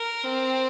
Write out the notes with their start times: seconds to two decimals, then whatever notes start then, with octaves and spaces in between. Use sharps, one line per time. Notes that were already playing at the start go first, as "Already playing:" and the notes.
Already playing: A#4
0.24 C4